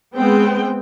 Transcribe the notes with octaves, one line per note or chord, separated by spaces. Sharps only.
G#3 B3 C4 G5